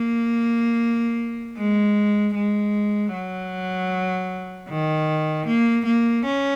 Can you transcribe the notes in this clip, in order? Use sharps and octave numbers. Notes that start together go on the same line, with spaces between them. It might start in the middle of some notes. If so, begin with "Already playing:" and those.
Already playing: A#3
G#3
G#3
F#3
D#3
A#3
A#3
C#4